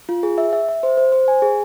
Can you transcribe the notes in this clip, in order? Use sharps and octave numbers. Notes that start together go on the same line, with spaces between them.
F4
G#4
E5
E5
E5
C5
C5
C5
G#5
G#4